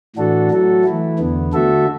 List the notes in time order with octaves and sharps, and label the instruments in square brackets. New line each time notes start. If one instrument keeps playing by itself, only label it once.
[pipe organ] A2 E3 D4 F#4 A4
F#3 A3 F#4 A4
E3 A3 E4
E2 D3 B3
D3 A3 F#4 A4 E5